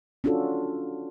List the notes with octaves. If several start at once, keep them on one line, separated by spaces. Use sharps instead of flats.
C#4 D4 F4 F#4 A4